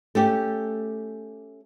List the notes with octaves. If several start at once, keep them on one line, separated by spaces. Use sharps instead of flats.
A3 C#4 G4